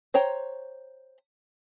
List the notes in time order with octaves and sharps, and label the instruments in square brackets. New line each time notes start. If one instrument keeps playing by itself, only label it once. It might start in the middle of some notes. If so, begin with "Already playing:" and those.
[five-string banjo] C5 C#5 G5 A#5